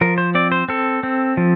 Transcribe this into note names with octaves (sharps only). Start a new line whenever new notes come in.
F3 A#4
C5
C4 D5
C5
C4 A4
C4
F3